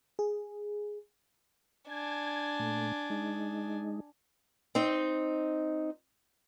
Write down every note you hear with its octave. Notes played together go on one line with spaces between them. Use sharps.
G#4
D4 G#5 G#6
A#2 A3
G#3 D#4
C4 D#4